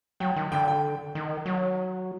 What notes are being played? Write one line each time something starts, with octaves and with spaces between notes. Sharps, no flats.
F#3 G5
D#3
D3 G5
G5
D#3
F#3